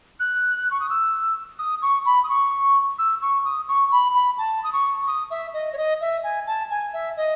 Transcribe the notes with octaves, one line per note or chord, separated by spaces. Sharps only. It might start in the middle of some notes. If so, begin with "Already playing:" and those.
F#6
C#6
D#6
E6
D#6
C#6
B5
D#6
C#6
E6
C#6
D#6
C#6
B5
B5
A5
D#6
C#6
D#6
E5
D#5
C#5
D#5
E5
G#5
A5
G#5
E5
D#5